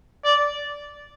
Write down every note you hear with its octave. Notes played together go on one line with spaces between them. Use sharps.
D5